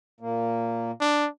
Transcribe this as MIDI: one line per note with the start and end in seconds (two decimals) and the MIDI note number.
0.20 0.91 46
0.20 0.91 58
1.01 1.28 62